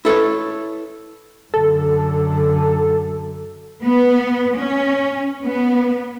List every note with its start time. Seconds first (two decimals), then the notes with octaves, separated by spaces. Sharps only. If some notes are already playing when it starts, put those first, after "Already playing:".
0.05 E4 A4 B4 C#5
1.54 F#2 D3 A4
3.83 B3
4.57 C#4
5.45 B3